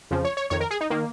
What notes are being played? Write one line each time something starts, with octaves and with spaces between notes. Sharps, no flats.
F2 C#3 F3
C#5
C#5
F2 D#3 C#5
A#4
G#4
D#4
D#3 A#3